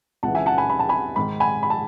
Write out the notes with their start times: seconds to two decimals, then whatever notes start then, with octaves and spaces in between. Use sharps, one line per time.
0.23 C#2 C#3 E3 F#5 A5
0.35 E5 G#5
0.46 F#5 A5
0.58 G#5 B5
0.70 B5
0.79 A5
0.89 G#5 B5
1.16 G#2 D#3 B5
1.40 G#5 B5
1.63 B5
1.70 A5